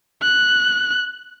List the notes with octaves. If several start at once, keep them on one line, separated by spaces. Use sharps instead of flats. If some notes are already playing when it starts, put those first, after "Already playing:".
F#6